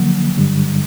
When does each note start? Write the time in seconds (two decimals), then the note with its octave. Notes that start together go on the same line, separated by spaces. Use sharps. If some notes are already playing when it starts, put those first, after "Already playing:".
Already playing: D3 F3 F#3 A#3
0.38 G2 D3 G3